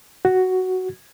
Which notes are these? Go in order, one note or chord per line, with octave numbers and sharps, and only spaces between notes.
F#4